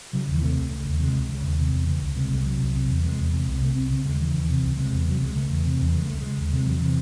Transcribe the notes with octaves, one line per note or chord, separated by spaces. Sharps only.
C#3 F#3
D#2 E3
C3 A3
C#2
C#3
D#2
C3 G#3
C#2
C#3
D#2
C3
E2
C#3
C#2
C3 G#3
C2 G#3
C3 F#3
C2
C3
E2
C3 G#3
E2
C3
C2
C3 A3
C2 C4
C#3 C4
D#2 G#3
C#3 E3
D#2
C3
C#2
C3 G#3
E2
C3 F#3
C#2 G#3
C#3 A3
E2
C3
E2
C#3 G#3
C#2 A3
C#3 G#3
D#2
C3 G#3
E2 F#3
C3 E3